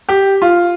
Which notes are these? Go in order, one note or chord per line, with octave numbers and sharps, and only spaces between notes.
G4
F4